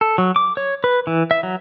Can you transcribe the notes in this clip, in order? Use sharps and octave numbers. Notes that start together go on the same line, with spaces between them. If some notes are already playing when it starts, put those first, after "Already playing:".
A4
F#3
D6
C#5
B4
E3
E5
F#3